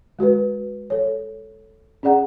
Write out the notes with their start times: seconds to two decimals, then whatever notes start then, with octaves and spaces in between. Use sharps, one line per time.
0.19 G#3 F#4 A#4 B4
0.90 A4 C#5
2.03 C#4 G#4 D5 F#5 A#5